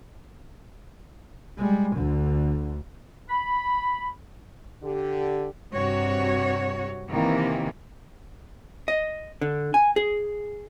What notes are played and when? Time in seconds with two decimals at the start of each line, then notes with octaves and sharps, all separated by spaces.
1.57 G3 G#3
1.97 D2 D3
3.29 B5
4.83 D3 G4
5.73 G2 C3 F#4 C#5
7.10 C3 D#3 E3 A#3
8.88 D#5
9.41 D3
9.74 G#5
9.96 G#4